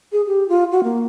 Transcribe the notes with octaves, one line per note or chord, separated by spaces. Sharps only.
G#4
G4
F4
F#4
A#3